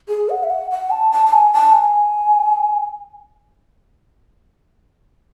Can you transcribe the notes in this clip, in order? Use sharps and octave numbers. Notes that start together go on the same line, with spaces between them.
G#4
F#5
E5
F#5
F#5
A5
A5
A5
G#5
A5
G#5